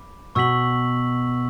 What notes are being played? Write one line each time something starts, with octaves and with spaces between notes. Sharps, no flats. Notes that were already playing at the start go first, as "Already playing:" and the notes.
Already playing: B5 D6
B2 C#6 E6 B6 F#7